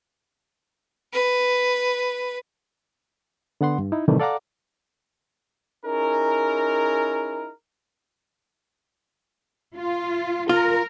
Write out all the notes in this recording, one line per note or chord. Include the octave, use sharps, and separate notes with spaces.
B4
D3 B3 F#5 C6
G2
D#4 E4
A2 C3 D#3 E3 G3 A3
A4 D5 F5 F#5 A#5 D6
C#4 D#4 E4 G#4 A#4
F4
F4 A#4